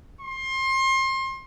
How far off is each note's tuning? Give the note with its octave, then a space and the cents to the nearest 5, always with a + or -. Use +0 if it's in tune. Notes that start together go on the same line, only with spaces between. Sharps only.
C6 +30